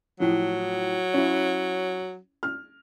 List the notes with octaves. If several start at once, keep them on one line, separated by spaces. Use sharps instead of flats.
A2 F3 F#3
C#4 E4
F6